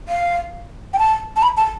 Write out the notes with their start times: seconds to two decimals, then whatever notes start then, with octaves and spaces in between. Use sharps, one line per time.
0.09 F5
0.93 G5
0.99 A5
1.36 A5
1.43 B5
1.57 A5